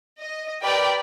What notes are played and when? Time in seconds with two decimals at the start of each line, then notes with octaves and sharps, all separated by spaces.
0.20 D#5
0.63 G4 A#4 B4 D5 G5 B5